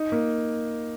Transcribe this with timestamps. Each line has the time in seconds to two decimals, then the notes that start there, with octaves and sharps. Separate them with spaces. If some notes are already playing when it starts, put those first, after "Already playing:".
Already playing: D#4
0.12 A#3